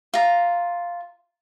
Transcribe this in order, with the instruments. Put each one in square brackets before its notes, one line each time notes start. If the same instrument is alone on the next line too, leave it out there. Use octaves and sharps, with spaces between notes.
[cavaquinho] F4 A#5